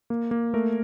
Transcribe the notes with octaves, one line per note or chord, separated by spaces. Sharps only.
A#3
A#3
A3 A#4